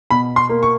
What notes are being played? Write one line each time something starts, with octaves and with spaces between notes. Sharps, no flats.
B2 B5
C6
A#3
C#6